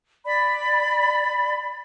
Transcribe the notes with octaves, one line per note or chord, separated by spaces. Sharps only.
D5 B5